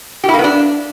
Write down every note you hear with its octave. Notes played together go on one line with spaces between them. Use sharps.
G4
E4
A#3
B3
D4